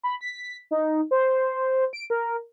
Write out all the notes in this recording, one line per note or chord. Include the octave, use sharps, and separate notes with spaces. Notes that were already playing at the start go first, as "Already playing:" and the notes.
B5
B6
D#4
C5
D7
A#4